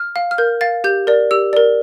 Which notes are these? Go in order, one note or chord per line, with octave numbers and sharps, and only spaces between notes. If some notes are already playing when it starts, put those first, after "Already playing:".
Already playing: F6
F5
F6
A#4 G6
F5 A6
G4 G6
A#4 D5
G4 E6
A#4 D5